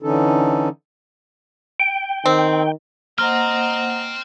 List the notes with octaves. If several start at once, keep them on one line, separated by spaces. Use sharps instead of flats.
D3 E3 C#4 D#4 A4
G5
D#3 C4
A#3 C5 D#5 F#5 G5 A#5 C6 F6